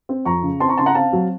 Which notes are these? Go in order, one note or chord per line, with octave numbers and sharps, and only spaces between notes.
C4
F2 A#5 C#6
C#3
C4 A5 C6
A#5 C#6
C#3 A5 C6
F#5 A#5
C4 F5 A5
F#3